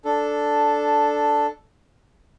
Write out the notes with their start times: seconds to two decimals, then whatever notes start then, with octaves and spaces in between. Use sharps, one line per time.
0.05 D4 A4